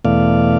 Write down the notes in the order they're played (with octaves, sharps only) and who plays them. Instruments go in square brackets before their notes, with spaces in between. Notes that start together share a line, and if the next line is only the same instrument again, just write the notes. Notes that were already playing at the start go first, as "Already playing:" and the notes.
[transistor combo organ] E2 B2 A3 D5 F5